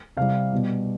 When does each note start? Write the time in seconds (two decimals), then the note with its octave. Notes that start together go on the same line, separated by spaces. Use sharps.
0.17 C3 G3 F5
0.52 B2 G3